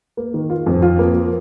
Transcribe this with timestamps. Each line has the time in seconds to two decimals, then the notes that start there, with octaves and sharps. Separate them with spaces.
0.17 A#3
0.34 D#3
0.50 F4
0.66 F2
0.82 F4
0.99 A#3
1.15 F3